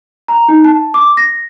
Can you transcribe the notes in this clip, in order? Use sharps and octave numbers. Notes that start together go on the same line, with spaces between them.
A#5
D#4
A5
D6
A#6